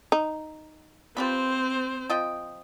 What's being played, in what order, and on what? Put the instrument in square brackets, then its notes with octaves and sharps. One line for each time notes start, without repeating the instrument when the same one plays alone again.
[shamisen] D#4
[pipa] F3 G4 B4 [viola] C4 C5
[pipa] F3 D#5 G5